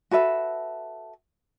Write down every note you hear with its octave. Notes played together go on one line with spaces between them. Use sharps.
F#4 A4 B4 E5